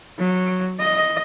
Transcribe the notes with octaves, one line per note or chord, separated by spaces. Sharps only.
F#3
D#5